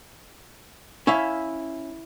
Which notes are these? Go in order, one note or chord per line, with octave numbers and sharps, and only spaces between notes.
C#4 E4 E5 F5